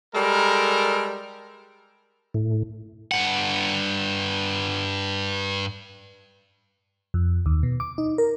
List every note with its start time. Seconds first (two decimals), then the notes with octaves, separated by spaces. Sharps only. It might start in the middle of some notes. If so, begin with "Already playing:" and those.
0.15 G3 G#3 A4 A#4
2.34 A2
3.11 G2 F#5
7.14 F2
7.46 D#2
7.63 B2
7.80 D6
7.98 D#4
8.18 A#4